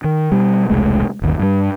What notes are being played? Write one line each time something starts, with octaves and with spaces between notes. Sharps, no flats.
D#3
B2 G3
E1 C2 G#3 A3
G1 D#2
G2 G3